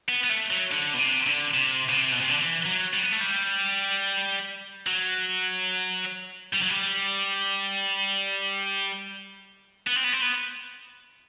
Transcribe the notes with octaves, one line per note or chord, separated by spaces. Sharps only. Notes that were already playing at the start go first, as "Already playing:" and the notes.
B3
B3
A3
F#3
D3
B2
C3
D3
C3
B2
C3
B2
C3
D3
E3
F#3
G3
B3
A3
G3
F#3
G3
F#3
G3
B3
C4
B3
C4
B3